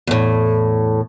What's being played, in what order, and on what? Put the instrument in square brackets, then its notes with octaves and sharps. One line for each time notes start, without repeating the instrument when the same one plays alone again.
[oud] E2 A2